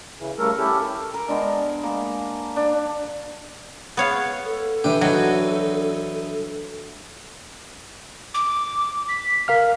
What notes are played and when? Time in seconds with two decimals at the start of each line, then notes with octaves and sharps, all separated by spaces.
0.19 C#3 E3
0.38 C#3 G3 A3 A4 A#4
0.58 C#4 E4 G4 A4
1.14 A#4
1.28 G#3 B3 D4
1.83 A#3
2.56 D4
3.97 B3 C#5 F5
4.45 A4
4.84 E3 D4 G4
5.01 E3 F#3 D#4
8.34 D6
9.09 B6
9.48 A#4 F5 F6